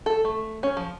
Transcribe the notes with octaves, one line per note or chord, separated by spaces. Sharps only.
A4
A3
C#4
F3